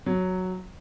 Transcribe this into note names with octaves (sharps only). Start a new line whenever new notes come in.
F#3